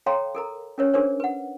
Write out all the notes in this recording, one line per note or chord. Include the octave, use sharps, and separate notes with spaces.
A4 C#5 F5 G5 A#5 C6
A4 A#4 A#5
C#4 A#4 C#5
D4 G#4 A#4 C5 C#5
B4 F#5